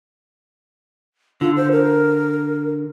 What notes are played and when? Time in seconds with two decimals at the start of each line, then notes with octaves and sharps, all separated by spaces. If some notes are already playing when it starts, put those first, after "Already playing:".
1.41 D3 F4
1.56 C5
1.71 A#4